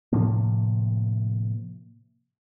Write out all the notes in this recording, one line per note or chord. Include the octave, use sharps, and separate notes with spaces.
A2 C3 F3 A#3